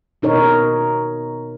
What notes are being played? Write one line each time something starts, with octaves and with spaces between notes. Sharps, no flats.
B2 D#4 A#4 C#5